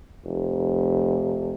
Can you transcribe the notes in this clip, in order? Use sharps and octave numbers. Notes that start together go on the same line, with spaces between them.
F1